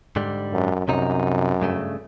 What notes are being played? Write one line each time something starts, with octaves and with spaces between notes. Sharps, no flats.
G#2 D3 G3
F#2
C2 F#2 C3 D#4
G2 C#3 A3